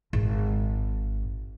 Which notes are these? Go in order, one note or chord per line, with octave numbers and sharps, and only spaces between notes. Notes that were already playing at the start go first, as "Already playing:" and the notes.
G#1 G#2